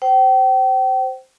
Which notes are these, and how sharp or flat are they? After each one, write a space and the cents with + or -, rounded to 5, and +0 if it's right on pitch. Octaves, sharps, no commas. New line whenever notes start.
C5 +0 G5 -35